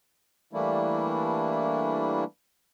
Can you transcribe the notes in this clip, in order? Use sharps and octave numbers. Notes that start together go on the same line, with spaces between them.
E3 G3 A3 A#3 D4 E4